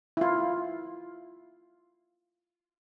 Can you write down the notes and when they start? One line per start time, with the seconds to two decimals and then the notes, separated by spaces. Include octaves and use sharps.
0.17 E4 F4